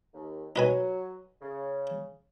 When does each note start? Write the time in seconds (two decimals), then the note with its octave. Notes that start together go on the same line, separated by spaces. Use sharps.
0.14 D#2
0.56 F#3 D#4 B4 G#5
1.41 C#3